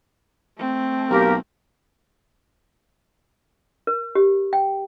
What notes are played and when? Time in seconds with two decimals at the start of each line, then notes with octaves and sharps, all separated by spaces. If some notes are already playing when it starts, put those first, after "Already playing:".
0.58 A3 C4
1.10 B1 A#3 G4 A#4
3.87 A#4
4.15 G4
4.53 G5